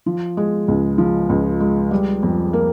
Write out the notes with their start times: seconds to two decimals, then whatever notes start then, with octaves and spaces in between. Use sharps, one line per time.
0.06 F3
0.37 G#3
0.68 C#2
0.98 F3
1.29 C#2
1.60 G#3
1.91 G3
2.23 F2
2.53 A#3